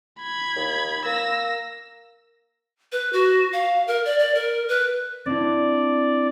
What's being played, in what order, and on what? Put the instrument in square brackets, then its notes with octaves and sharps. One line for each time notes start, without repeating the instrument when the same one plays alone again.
[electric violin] B5 G#6
[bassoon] D#2
[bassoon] A#3 [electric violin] E6 A#6
[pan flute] B4
F#4
F5
A#4
D5
D5
A#4
B4
[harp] C4 D4 E4 [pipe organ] D5